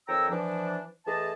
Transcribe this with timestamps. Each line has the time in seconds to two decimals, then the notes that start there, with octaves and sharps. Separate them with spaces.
0.08 F2 D#3 C#5 G5 A#5 E6
0.30 E3 F3 D4
1.06 E3 A3 G#4 D#5 A5